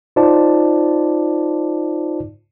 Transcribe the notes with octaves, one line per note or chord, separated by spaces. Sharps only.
D#4 F4 C5 D5 A5